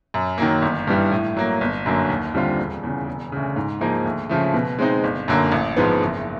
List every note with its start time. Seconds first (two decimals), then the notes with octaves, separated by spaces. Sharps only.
0.14 F#2
0.38 D#3 F#3 A#3
0.62 G1
0.87 G2 E3 G3
1.11 A2
1.36 F#3 A#3
1.61 G1
1.86 F#2 D3 F#3 A#3
2.10 D#2
2.35 D3 G3 C4 F4
2.59 E1
2.83 E2 C#3
3.07 E1
3.32 D2 C#3
3.56 G#2
3.81 F3 A#3 D#4 G#4
4.05 D2
4.29 C#3 F3 A3
4.54 B2
4.79 G#3 C4 D#4
5.04 G1
5.28 F#2 D3 F#3 A#3
5.52 A1
5.76 G#2 F3 G#3 B3
6.01 F#1